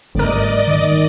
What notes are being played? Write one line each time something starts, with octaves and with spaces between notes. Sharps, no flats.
G1 G#2 G3 A3 A#4 D5 D#5
D#3